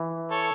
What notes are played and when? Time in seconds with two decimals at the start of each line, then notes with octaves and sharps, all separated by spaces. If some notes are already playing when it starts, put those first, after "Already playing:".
Already playing: E3
0.31 A4 C#5